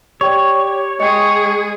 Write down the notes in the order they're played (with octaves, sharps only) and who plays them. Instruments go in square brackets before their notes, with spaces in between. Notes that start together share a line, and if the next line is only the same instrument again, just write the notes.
[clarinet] G4 [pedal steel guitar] C#5 [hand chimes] D5 G5 C#6
[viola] G#3 G#4 [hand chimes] D#5 G5 [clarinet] C#6